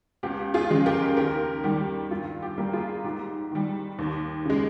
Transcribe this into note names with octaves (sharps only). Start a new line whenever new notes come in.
C#2 G4
F4 G#4
C#3 F3 G#3
G4 A#4
D#2 G4 A#4
D#3 G3 G4
G2 F4
G4
G3 A#3
F4 G#4
G#2 G4
D#3 G3
D#2
C#3 G#3